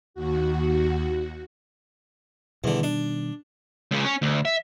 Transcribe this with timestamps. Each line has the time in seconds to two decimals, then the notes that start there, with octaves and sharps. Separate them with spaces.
0.14 D#2 F#4
2.64 E2 B2 D3 D#3 G3
2.83 D4
3.91 C#2 C#3
4.05 C#4
4.22 D2
4.45 E5